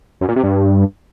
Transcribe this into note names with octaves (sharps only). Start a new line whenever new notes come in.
F#2
A#2
C3
G2